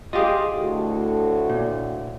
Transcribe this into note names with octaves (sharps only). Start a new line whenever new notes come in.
F4 G4 G#4 D#5 F5
D2 A2 F#4
A#2